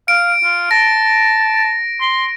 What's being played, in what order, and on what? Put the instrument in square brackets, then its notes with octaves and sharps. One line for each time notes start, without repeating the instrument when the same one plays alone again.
[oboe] F5 [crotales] D7
[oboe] F4
[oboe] A5 [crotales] A#6
[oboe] C6